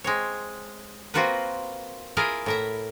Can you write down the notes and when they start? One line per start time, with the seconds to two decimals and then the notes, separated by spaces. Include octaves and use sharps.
0.04 G#3 C4 C#5
1.14 A#3 C4 F4 F#4 A#4 B4
2.17 E4 F4 G#4 A#4 F5
2.46 A2 A#4 E5